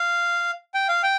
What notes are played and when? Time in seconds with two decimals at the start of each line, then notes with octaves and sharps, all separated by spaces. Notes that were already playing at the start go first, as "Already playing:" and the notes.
Already playing: F5
0.74 G5
0.88 F5
1.03 G5